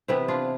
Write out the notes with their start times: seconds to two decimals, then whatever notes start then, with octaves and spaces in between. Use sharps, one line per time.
0.08 C3 E3 B3 E4 G4
0.28 D4 F4